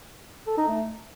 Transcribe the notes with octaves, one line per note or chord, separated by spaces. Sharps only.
A4
D#4
A3